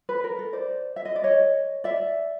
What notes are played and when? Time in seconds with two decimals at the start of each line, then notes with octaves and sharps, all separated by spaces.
0.09 B4
0.24 A#4
0.39 A4
0.53 C5 D5
0.96 E5
1.05 D#5
1.16 D5
1.24 C#5 D#5
1.84 D5 E5